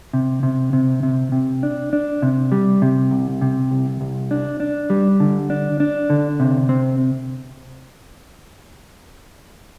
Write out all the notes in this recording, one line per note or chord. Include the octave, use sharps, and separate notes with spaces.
C3
C3
C3
C3
C3
D4
D4
C3
G3
C3
C2
C3
C2
C2
D4
D4
G3
D3
D4
D4
D3
C3
C4